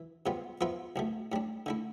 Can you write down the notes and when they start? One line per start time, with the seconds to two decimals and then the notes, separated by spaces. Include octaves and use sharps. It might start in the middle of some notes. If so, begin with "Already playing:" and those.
Already playing: E3
0.26 C3 G3 B3 F4
0.61 F3 B3 F4 B4 E5
0.96 C2 B2 A3
1.32 A2 G3 D4
1.66 D3 A3 E4